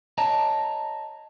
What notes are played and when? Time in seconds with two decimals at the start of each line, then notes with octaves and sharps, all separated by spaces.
0.18 C#5 D#5 A5 A#5